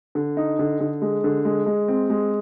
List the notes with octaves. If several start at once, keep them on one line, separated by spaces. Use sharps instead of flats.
D3
D#4
D3
D3
G#3
D3
G#3
G#3
C4
G#3